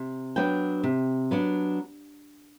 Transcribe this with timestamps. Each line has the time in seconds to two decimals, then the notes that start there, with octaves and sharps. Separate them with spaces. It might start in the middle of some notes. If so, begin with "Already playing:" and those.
Already playing: C3
0.36 F#3 B3 D4 G5
0.83 C3
1.31 F#3 B3 D4